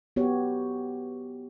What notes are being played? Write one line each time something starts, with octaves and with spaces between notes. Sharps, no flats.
B3 F#4 G4 C#5